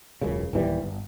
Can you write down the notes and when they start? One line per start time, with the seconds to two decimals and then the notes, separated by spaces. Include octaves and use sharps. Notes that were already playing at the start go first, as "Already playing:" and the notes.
0.21 E1 C#2 F#2 C#3
0.53 D1 D#2 E3 G3
0.82 G1